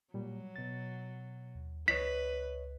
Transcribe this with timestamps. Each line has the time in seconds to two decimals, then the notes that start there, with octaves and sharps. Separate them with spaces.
0.14 A#2 F#3 G3
0.56 B2 A6
1.55 D#2
1.88 C#2 B4 C#5 D#5 B6